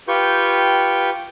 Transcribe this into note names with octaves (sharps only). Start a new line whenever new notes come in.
F4 G4 B4 G5 C#6 G6